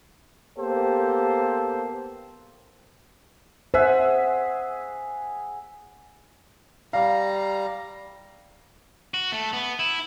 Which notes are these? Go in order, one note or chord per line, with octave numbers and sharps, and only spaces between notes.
A#3 B3 G4 A4 C5
G#4 C5 E5 F#5
G3 F5 A#5
F#4
A3
B3
E4